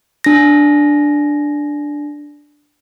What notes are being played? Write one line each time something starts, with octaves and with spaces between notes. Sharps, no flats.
D4 A#6